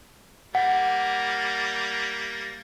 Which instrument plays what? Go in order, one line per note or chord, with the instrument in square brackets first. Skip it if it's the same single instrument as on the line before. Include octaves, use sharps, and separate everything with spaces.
[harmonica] G3 A#3 [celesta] F#5